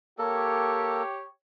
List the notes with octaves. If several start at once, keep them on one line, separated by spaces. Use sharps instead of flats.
A#3 G4 A4 C#5